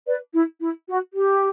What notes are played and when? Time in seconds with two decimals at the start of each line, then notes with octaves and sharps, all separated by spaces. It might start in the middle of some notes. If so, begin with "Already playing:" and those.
0.06 B4 D5
0.33 E4
0.61 E4
0.87 F#4
1.15 G4